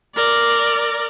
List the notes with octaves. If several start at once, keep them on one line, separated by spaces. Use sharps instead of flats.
A#4 D5